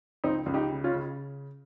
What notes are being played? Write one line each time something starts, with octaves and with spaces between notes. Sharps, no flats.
C#2 C4 D#4
C#2
D#4 G4
C#3
C#4 F4
C#3